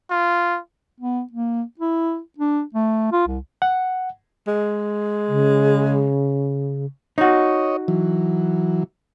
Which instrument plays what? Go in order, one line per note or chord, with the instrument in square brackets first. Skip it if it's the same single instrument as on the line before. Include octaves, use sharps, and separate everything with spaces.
[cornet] F4
[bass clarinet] B3
A#3
E4
D4
A3
F4
C2
[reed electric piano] F#5
[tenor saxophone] G#3
[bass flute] C#3
[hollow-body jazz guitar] D#4 F#4 [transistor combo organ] C#5 D#5
[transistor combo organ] E3 F#3